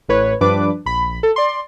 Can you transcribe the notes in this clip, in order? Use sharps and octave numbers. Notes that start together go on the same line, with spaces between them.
A1 A2 B4 C#5
G2 F3 G3 D4 B4 D6
A#1 B5
A4
D5 C6